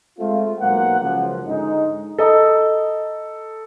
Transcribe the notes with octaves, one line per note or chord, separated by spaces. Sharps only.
G#3 A3 C4 F4
B1 A#3 C5 F#5
C#2 F#2 F3
G#2 D3 G#3 D#4
A4 D#5 A#5 D#6